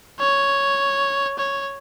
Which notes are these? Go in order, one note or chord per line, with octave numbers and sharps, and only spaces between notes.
C#5
C#5